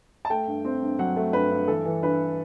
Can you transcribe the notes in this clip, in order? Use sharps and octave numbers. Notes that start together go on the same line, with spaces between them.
A5
A3 G5
G2
C4
G2
F#3 F#5
A3
G2 B4
G2
E3 A4
E3
G2 B4